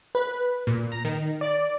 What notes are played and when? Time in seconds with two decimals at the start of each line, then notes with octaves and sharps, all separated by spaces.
0.15 B4
0.67 A#2
0.92 A#5
1.05 D#3
1.41 D5